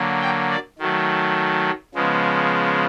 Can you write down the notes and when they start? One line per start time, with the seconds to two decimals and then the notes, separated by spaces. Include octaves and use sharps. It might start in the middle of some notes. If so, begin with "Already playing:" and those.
Already playing: D3 F#3 A#3
0.22 G5
0.50 D5
0.79 D#3 F#3 A3
1.94 C#3 F3 G#3 B3